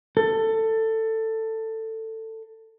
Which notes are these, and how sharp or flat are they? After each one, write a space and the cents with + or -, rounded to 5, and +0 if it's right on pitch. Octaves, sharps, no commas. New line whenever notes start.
A4 +15